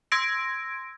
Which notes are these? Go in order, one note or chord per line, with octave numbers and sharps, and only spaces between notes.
C6 E6 G#6 A#6 D7